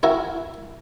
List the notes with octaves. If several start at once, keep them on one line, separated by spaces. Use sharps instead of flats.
E4 F#4 A#4 G#5